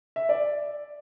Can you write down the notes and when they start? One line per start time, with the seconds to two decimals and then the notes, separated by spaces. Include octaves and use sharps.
0.16 E5
0.29 D5